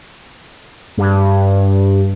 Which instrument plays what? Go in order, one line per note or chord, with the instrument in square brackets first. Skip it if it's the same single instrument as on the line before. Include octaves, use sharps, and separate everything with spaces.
[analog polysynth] G2